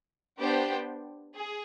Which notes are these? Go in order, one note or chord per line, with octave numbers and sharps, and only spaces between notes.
B3 D4 G4 C5 G5
G#4